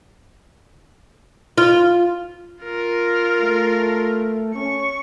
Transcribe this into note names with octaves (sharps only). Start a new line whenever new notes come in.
F4
F4 A#4
A3
C#4 C#6